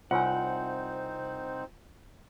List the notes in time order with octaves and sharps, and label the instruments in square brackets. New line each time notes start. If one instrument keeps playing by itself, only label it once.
[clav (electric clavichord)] C2 [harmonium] C4 D#4 C5 [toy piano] F4 C#5 G#5 [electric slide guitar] F#5